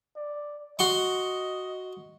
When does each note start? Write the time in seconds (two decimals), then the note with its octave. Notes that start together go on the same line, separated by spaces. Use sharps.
0.16 D5
0.79 F#4 D#5 C6 C#6